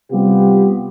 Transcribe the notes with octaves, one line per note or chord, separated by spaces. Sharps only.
C3 G3 B3 F4 G4